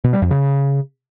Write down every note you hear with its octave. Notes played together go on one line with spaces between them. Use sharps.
B2
G3
F2
C#3